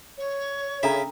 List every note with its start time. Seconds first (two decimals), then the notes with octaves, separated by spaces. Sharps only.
0.18 C#5
0.83 C#3 D4 A4 E5 A#5 B5